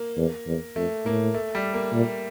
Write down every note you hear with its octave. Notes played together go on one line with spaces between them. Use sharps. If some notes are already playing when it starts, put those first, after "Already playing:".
Already playing: A#3
E2
E2
F2 A3
A2 A#3
A3
G3
A#3
A#2